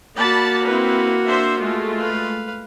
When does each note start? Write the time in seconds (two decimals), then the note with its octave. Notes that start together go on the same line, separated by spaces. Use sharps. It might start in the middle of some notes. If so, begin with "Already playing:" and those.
0.16 A#3 F#4 D5 A5 B5
0.68 C4 E4 B4
1.27 D4 C5 E5
1.61 G#3 A3 F4
1.99 B4 F5